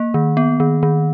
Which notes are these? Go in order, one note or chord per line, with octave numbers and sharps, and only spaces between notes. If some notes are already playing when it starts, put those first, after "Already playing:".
Already playing: A#3
D#3
B3
D#3
D#3